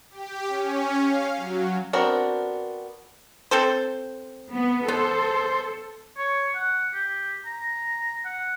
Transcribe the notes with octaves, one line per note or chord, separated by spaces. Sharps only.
G4
C#4
F5
F#3
B3 C4 D4 F#4 A#4
C4 A4 C5
B3
B3 A4 C5
C#5
F#5
G4
A#5
F#5